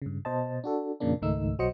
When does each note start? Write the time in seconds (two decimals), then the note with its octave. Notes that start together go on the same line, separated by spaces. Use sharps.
0.02 G2 C#3
0.25 B2 C5 D#5 A5
0.64 D4 F#4 A4
1.00 F2 A#2 C#3 A#3 D4
1.22 C#2 G#2 D#3 A3 D#4 E6
1.59 B1 F#3 F#4 C5 D#5 C#7